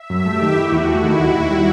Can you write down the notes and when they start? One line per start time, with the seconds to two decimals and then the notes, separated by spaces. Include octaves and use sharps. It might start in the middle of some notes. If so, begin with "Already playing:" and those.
Already playing: E5
0.10 F#2
0.25 A3 G4
0.41 D#3
0.56 E4 F#4
0.72 E2
0.88 A3 E4
1.04 D#3
1.20 D#2
1.35 D#2
1.51 G3